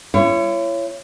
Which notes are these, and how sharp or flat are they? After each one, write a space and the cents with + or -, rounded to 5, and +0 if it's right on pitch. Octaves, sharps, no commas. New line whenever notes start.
E4 +45 C#5 +0